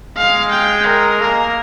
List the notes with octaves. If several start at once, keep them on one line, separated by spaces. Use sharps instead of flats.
G#3 F5
G5
A#4
A#3 A#4